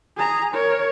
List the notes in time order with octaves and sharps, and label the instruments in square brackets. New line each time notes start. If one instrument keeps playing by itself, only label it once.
[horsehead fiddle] G#4 A#5
A#4 C#5